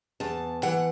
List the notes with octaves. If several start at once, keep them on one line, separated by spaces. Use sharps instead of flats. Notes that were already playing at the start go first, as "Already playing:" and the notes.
E2 A5
E3 F#5